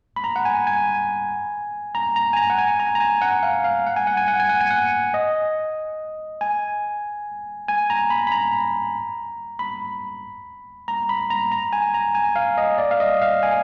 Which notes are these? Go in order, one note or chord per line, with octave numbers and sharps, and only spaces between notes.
B5
A#5
F#5
G#5
G#5
A#5
A#5
G#5
A#5
F#5
G#5
A#5
A#5
G#5
F#5
F5
F5
F#5
G#5
F#5
G#5
F#5
G#5
F#5
G#5
F#5
D#5
G#5
G#5
A#5
B5
B5
A#5
B5
A#5
B5
A#5
A#5
G#5
A#5
G#5
F5
D#5
D5
F5
D#5
F5
G#5